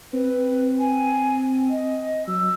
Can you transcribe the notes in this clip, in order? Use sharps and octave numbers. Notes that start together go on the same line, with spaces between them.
C4 B4
G#5
D#5
F#3 E6